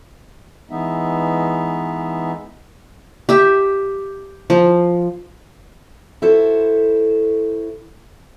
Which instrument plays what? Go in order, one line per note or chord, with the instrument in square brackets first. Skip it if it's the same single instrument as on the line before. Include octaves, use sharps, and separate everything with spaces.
[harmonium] E3 G#3 B3 D#4 E5
[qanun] G4 E5
F3
[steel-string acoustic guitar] E4 F#4 A4 C5